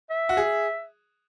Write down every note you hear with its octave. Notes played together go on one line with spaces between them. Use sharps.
E5
F#4
G#4